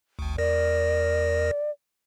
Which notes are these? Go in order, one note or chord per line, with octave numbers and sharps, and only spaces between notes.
G#1 D2
E2 A#4 D5 A#6